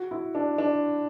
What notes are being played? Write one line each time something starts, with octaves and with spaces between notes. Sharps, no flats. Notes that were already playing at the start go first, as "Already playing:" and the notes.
Already playing: F#4
E4
D4
D4